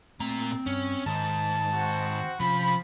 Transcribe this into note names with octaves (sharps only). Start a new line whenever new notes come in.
A#2 A3 C4 A#5
G2 C#4
G#2 D#3 A5
C4 F#4
C3 F3 C4 C#4 B5